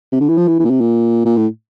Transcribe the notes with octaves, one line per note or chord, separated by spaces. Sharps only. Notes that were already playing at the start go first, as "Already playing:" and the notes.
C3
D3
E3
F3
E3
E3
A#2
C3
A#2
A#2
A2